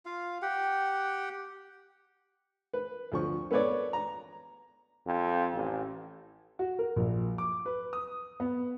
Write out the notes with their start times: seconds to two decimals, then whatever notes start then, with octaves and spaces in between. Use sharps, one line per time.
0.06 F4 F5
0.42 G4 F#5 G5
2.73 B4
3.12 D2 F3 C#6
3.51 B3 A4 B4 C#5 D5
3.93 A#5
5.06 F2
5.53 A1
6.59 F#4
6.79 A#4
6.96 A#1
7.38 D6
7.66 B4
7.93 D#6
8.40 B3